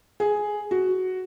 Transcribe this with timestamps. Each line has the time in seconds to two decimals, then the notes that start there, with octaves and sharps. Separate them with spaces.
0.20 G#4
0.71 F#4